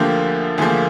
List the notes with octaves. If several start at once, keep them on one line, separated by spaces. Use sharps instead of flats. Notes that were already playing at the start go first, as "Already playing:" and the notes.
Already playing: D2 D3 F3 A#3 G4
D2 D3 F3 A#3 G#4